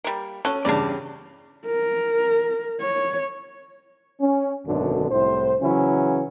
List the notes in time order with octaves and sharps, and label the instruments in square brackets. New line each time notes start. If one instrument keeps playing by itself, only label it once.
[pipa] G3 A#3
[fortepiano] C#4 [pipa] F#4 A4
[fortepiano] E2 G2 C#3 [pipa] D4 D5
[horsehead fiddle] A#4
C#5
[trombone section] C#4
G#1 F#2 B2 D3
C2 A2 C5
C#3 E3 F#3 C#4 E4